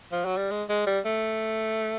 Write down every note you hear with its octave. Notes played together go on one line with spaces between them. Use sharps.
F3
F#3
G3
G#3
G#3
G3
A3